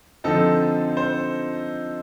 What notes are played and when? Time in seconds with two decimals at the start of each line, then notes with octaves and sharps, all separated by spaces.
0.24 D3 F3 C4 D#4 A4
0.97 C5